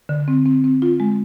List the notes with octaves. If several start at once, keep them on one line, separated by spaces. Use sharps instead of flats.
D3
C4
C4
C4
F4
G#3